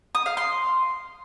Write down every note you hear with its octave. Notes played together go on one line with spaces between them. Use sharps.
D#6
F5
C6